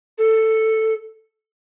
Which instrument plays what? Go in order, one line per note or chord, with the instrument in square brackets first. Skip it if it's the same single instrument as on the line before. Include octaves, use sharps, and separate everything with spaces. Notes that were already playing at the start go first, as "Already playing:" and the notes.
[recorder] A4